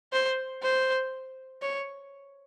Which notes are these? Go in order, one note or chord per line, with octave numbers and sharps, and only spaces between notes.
C5
C5
C#5